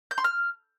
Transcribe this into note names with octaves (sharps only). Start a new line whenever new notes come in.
G6
C6
F6